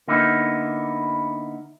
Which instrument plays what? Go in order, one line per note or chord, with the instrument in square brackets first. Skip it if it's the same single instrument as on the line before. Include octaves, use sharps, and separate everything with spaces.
[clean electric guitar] D3 A#3 B3 D#4 E4